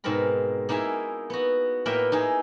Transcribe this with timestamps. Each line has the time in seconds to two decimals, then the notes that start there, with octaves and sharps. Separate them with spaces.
0.04 G#2 B2 C4 A#4 B5
0.69 A#3 D#4 E4 G#4 E5
1.30 B3 F#4
1.86 A2 A#3 A#4 B4 E5 G5
2.12 D#4 E4 G#4